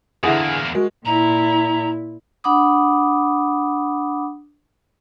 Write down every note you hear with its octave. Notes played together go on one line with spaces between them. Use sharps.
E2 D3 E3 A#3 G#4 E5 F#5 D#6
G#3 F#4 A#4
A#2 E4 A#5
D4 F#5 B5 D6 D#6